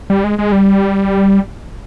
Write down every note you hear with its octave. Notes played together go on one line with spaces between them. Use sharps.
G3
G#3
G#3
G3